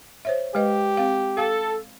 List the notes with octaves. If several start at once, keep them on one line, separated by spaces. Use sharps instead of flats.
C5 C#5 E5
G#3 G4 B4 D#5
C4 F5
A4 F5